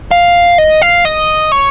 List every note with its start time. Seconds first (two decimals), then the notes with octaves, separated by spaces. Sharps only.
0.11 F5
0.58 D#5
0.82 F5
1.05 D#5
1.52 C#5